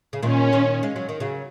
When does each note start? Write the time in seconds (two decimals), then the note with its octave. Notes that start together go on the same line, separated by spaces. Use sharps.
0.13 C#3
0.22 A#2 D#3 C#4
0.53 A#2 D#3
0.83 G#3
0.96 F#3
1.09 D#3
1.20 C#3 F#3